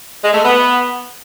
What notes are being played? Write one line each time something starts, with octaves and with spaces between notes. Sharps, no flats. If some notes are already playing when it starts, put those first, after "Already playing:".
G#3
A3
B3